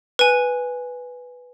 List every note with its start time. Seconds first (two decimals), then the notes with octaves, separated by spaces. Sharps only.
0.19 B4 G#5